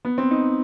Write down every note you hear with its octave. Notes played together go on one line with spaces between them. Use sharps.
B3
C4
D#4